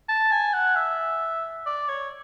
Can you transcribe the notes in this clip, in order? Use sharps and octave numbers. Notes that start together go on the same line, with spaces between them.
A5
G#5
F#5
E5
D5
C#5